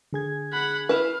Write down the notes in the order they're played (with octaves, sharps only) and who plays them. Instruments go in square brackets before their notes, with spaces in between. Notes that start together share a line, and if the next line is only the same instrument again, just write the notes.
[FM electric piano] D3 G#4 G#6
[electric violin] F#5 B5
[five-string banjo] E4 B4 [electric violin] F5